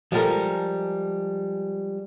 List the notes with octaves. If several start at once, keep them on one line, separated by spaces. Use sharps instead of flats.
F3 G3 G#3 A4 A#4